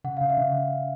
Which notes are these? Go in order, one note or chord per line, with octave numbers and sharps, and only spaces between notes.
C#3 F#5
F5
C#3
E5
C#3